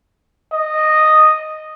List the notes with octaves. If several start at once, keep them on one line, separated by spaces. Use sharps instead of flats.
D#5